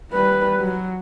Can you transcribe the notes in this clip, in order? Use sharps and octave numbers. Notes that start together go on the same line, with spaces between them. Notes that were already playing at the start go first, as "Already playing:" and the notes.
G3 B4
F#3